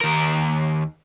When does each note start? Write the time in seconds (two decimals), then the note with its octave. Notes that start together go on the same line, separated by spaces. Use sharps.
0.01 D#2 A#4